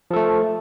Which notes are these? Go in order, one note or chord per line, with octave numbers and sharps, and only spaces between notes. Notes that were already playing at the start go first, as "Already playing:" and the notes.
F3 A3 A4